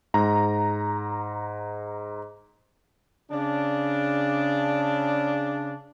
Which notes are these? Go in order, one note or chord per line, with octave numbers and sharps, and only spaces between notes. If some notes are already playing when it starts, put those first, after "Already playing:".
G#2 A#5
C#3 D4